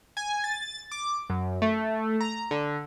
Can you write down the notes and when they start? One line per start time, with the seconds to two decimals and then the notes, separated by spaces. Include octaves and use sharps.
0.17 G#5
0.44 A6
0.92 D6
1.29 F#2
1.62 A3
2.21 A#5
2.51 D3